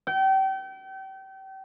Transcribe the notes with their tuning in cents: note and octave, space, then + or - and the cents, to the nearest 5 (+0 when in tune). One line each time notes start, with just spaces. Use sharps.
G5 -35